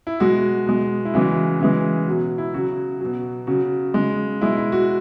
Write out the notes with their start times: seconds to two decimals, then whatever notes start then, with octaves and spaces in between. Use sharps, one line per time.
0.07 E4
0.20 B2 G#3 F#4
0.66 B2 G#3
1.05 E4
1.14 C#3 E3 G#3 F#4
1.60 C#3 E3 G#3
2.07 B2 F#3
2.38 E4
2.54 C#3 F#3 F#4
3.01 B2 F#3
3.47 C#3 F#3 F#4
3.94 C#3 G#3
4.41 B2 G#3 E4
4.57 E4
4.72 F#4